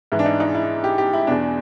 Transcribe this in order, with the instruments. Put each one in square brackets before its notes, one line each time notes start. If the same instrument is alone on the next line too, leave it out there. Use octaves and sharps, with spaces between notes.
[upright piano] G#2 E3 E4
D4
D#4
D#4
E4
G4
G4
E4
E2 B2 D4